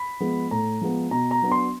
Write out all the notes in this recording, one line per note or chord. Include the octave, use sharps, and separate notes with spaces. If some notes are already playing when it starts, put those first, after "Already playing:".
Already playing: B5
F3 G#3 B3
A2 A#5
F3 G#3 B3
B2 A#5
A#5
F#3 B3 D4
C6